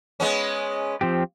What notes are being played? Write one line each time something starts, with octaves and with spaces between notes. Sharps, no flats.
G#3 B3 C#4
F3 C4 G4